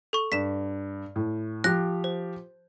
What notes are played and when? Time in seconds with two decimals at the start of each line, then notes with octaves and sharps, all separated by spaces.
0.13 A4 C#6
0.32 G2 B6 E7
1.16 A2
1.64 F3 G4 F#6 A#6
2.04 C5